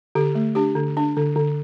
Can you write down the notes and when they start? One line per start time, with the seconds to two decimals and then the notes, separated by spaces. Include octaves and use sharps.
0.15 D3 G4
0.35 A3
0.55 D4 G4
0.75 D3
0.97 D4
1.17 D3
1.36 D3